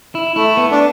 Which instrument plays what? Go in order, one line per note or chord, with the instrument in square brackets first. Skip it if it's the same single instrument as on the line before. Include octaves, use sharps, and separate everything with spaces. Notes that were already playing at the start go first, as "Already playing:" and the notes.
[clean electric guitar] E4
[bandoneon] A3 [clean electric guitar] E4
[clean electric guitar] B3
[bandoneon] D4